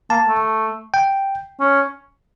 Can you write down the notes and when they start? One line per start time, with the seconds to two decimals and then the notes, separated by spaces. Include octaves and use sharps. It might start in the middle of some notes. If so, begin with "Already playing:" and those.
0.10 A#3 A5
0.27 A3
0.94 G5
1.60 C#4